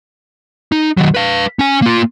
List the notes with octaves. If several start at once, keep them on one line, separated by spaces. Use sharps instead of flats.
D#4
D#3 F#3
B4 F5
C#4 G#5
A#3 F4